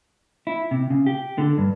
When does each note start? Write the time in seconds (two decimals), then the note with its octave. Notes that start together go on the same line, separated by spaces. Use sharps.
0.47 E4
0.71 C3
0.90 C#3
1.06 G4
1.38 D3
1.58 G2